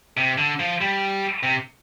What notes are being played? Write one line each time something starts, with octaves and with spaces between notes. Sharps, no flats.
C3
D3
F3
G3
C3